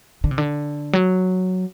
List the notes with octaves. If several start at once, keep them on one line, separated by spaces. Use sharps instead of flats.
D3
C3
D3
F#3